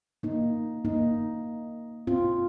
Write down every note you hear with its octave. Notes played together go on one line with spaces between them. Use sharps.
A#3 D#4
A#3 D#4
C4 F4